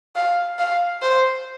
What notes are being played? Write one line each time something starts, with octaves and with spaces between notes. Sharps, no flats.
F5
F5
C5